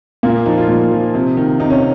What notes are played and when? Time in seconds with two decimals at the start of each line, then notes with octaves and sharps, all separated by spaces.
0.23 A#2 A#3
0.46 F3 D#4
0.57 F4
0.69 A#2
0.92 F3
1.14 C3
1.37 D#3
1.60 C3 D#4
1.70 C#4